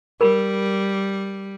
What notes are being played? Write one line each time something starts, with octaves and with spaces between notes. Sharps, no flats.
G3 A#4 B5